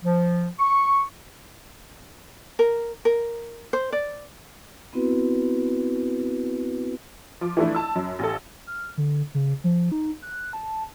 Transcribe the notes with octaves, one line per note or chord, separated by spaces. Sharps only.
F3
C#6
A#4
A#4
C5
D5
B3 C4 E4 F#4 B4
F3 D6
E3 F3 A3 D4 E4
A5 E6
F#2
A1 A4
F6
D3
C#3
F3
D#4
F#6
A5